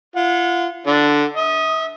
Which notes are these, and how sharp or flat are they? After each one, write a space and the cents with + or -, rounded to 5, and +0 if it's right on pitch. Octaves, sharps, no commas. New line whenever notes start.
F4 -35 F#5 -35
D3 +0 D4 +0
E5 -35 D#6 +0